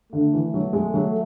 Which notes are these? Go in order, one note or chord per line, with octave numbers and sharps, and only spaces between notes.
D3 A3
E3
F#3
G#3
F#3